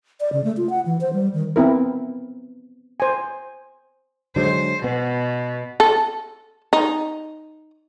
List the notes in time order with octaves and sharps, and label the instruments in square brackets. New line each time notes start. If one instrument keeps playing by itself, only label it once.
[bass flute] D5
C#3
A3
F4
F#5
E3
C5
G3
D#3
[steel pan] B3 C4 E4 A#4
C5 G#5
[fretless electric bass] D3 F#3 G#3 [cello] C5
[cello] B2 [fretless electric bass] B3
[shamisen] A4
D#4